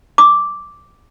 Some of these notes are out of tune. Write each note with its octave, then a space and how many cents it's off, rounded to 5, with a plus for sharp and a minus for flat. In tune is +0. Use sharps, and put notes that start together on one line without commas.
D6 -5